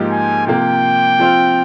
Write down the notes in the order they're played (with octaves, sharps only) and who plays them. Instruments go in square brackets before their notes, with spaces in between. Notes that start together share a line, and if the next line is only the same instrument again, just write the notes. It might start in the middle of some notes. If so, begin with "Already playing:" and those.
Already playing: [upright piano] G#2 F3 A#3 D#4 G4
[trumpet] G#5
[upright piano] C3 F3 A#3 [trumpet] G5
[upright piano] F3 C4 F4